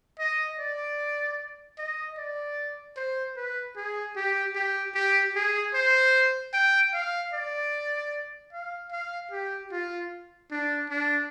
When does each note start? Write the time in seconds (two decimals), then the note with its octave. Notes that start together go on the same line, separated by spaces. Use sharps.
0.19 D#5
0.59 D5
1.78 D#5
2.18 D5
2.96 C5
3.37 B4
3.76 G#4
4.16 G4
4.56 G4
4.95 G4
5.35 G#4
5.74 C5
6.53 G5
6.93 F5
7.33 D5
8.53 F5
8.92 F5
9.31 G4
9.72 F4
10.51 D4
10.90 D4